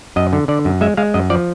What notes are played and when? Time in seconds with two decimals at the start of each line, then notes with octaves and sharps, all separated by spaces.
0.16 F#2 D#5
0.33 D3
0.48 D3 D5
0.65 F#2
0.81 G#3 E5
0.97 G#3 F5
1.14 F#2 D#5
1.30 F3 D5